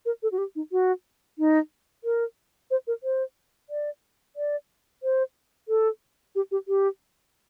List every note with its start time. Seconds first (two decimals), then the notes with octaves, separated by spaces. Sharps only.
0.06 A#4
0.23 A4
0.32 F#4
0.38 G4
0.56 D#4
0.72 F#4
1.39 D#4
2.04 A#4
2.71 C5
2.87 A#4
3.03 C5
3.70 D5
4.36 D5
5.03 C5
5.68 A4
6.35 G4
6.51 G4
6.68 G4